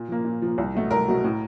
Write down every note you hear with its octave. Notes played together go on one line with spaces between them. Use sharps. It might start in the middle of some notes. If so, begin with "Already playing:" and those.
Already playing: A#2
F3 A#3
A#2
F3 A#3
C2
B2 F#3 A3
C2 A#4
B2 F#3 A3
A2